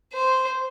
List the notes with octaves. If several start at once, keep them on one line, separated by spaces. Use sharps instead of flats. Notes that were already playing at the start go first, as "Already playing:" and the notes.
C5